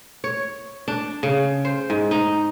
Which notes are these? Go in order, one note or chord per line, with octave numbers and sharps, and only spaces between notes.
C#5
D4
C#3
C5
G#2
D#4